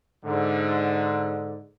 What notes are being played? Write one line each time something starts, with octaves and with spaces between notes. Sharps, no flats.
G#2 D3